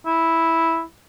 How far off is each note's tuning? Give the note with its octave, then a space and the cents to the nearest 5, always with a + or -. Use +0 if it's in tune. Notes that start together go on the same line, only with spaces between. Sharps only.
E4 -5